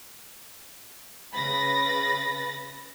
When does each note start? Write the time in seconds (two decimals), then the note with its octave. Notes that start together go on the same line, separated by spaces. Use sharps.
1.33 C#3 B4 B5 A6 A#6